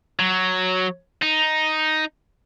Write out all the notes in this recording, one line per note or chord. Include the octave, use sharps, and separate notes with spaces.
F#3
D#4